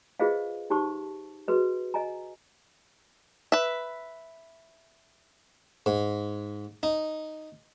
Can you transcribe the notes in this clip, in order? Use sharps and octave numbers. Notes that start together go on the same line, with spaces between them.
F4 G#4 B4 C5 D#5 F5
D#4 G4 C5 A5 C#6
F#4 G#4 B4 D#5
D#5 G#5 A#5
B4 E5
G#2
D#4